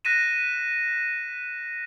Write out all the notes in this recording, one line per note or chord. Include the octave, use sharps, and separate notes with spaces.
F#6 A#6 B6 D#7 E7